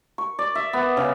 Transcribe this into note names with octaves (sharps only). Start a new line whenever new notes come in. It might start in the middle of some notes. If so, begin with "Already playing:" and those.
C#6
D5
E5
B3
C#3